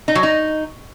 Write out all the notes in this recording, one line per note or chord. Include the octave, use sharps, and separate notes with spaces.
D#4
F#3
D#4